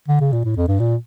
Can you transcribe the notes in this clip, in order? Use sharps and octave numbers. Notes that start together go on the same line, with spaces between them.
D3
C#3
A#2
A2
F2
G2
A#2